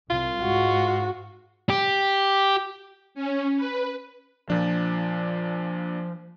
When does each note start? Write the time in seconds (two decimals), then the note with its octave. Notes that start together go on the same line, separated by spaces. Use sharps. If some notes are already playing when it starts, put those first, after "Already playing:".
0.10 C2 F4
0.43 G#2 F#4
1.69 G4
3.15 C#4
3.57 B4
4.50 A#2 F3 D4